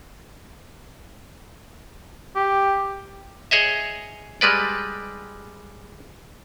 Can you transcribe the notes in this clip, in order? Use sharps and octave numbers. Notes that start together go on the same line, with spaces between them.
G4
G#4 C#5 D#5 E5
G3 G#3 B4 D5